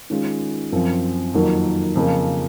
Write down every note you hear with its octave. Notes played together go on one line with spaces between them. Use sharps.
D#3 G#3 C#4 F4
F#2 F3 C4
F2 D#3 F#3 A#3
F2 C#3 F3 A#3